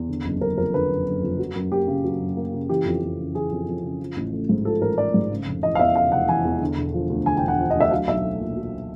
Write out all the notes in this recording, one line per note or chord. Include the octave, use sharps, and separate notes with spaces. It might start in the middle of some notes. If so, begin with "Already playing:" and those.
Already playing: E2
D3
F#1
F#1 A#4
F2 A#4
D3 B4
F#1
F#1
F2
F#3
F#2
A#3 G4
C#3
F#3
F#2
A#3
C#3
E3 G4
F2
F2
C#3
E3 G#4
F2
F2
C#3
F3
A1
A3
G#2
F3 A4
A1 A#4
A3 D5
G#2
C#3
F1
E3 D#5
F5
E2 E5
C#3 F5
F1 F#5
E3 G#5
E2
D3
E1
F3
D2
D3 G#5
G5
E1
F#5
F3
D2 D#5
E5
F#3 F5
B1 E5
A3
A#2
F#3